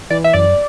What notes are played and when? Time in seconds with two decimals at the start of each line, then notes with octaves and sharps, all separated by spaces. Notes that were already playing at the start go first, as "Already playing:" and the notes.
0.10 E3 D5
0.24 E5
0.33 F#2 D5